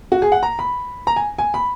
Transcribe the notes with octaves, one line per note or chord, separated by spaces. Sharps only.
F#4
G#4
F#5
A#5
B5
A#5
G#5
G#5
B5